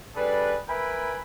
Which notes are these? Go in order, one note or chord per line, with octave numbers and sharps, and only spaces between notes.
G3 D4 G#4 A4 B4
A#4 B4 E5 G5 G#5 B5